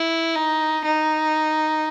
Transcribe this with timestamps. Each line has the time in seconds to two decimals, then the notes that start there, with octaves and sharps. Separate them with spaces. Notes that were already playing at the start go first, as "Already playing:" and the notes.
Already playing: E4
0.35 D#4
0.84 D#4